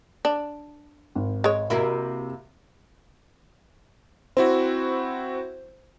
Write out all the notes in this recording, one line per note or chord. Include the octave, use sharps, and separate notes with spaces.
D4
G#1
G#3 C#5
C3 A#3 E4 F#4
C4 E4 F#4 C5